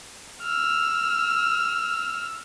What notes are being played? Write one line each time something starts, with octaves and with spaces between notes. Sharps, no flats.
E6 F6